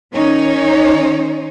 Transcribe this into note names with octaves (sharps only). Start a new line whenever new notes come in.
D#3 C#4 D#4 C#5